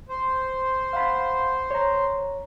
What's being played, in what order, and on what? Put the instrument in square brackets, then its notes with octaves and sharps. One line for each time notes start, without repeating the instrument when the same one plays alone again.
[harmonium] C5
[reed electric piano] F5 F#5 B5
C#5 A#5